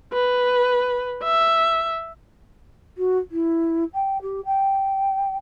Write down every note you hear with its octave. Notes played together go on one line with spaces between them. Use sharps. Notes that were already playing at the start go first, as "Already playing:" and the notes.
B4
E5
F#4
E4
G5
G4
G5